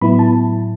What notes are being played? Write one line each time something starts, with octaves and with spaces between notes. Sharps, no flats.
A2 F#3 B3 E4 B5
A5